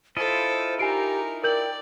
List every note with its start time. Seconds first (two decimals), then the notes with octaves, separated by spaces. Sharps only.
0.17 E4 F4 A4 C5 D#5
0.79 D#4 G4 A#4 G#5 C7 D7
1.44 A#4 D5 G5 G6 F#7